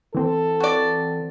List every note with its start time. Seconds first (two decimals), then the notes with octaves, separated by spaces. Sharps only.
0.15 E3 C4 A4
0.60 F#4 D5